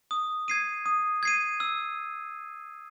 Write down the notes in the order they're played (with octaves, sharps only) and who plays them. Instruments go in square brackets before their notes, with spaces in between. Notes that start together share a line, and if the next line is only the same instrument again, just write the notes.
[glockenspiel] D#6
G#6 C7 D#7
D#6
G#6 C7 D#7
E6